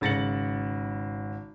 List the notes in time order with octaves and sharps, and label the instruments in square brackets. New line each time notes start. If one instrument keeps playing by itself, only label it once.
[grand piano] G#1 C#3 A6 A#6 C#7 F#7